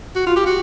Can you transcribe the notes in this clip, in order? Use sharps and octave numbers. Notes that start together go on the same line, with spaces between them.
F#4
F4
G4
F#4